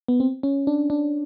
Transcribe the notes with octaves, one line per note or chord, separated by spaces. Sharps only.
B3
C4
C#4
D4
D4